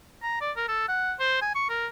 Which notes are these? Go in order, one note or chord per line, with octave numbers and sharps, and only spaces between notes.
A#5
D5
A#4
A4
F#5
C5
G#5
C#6
A#4